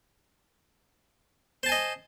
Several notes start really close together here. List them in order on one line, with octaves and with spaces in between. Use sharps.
C5 A5 G#5 D#5